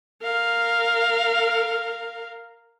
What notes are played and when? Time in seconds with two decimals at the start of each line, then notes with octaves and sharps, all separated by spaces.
0.22 A#4 F5